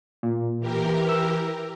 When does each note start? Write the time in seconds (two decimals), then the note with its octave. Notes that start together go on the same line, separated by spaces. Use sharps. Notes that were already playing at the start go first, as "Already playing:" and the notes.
0.23 A#2
0.59 E3 G4 A#4
1.09 E6